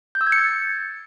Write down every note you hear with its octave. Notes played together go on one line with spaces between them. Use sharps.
G6
E6
G#6
C#7
A6